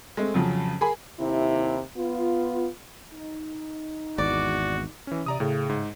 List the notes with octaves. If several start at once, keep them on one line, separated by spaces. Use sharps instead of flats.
G#3 A3 C4
F2 C#3 F3 F#3
G#4 A#4 G#5 B5
D#2 C3 E4
B3 F4
D#4
G#1 E2 F#4 D5
E3 C#4
C3 D5 A#5 D#6
A2 C#3
G#2